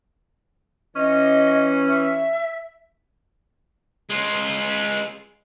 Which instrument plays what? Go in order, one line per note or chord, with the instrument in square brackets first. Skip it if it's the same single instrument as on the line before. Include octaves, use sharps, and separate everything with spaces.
[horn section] E3 C#4 [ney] D#5
[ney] E5
[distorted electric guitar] G#3 F4